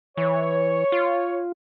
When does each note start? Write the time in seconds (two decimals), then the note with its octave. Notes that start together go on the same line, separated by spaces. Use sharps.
0.17 E3 C#5
0.92 F4